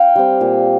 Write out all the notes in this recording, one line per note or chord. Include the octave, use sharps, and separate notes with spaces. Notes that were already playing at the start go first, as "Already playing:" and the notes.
Already playing: F5 G5
G3 C4
A#2